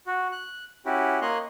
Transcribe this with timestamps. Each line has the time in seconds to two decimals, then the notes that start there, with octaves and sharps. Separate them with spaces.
0.07 F#4
0.32 F#6
0.86 C#4 E4 F#4 G4
1.22 A#3 C#5 D#5 C6 F#6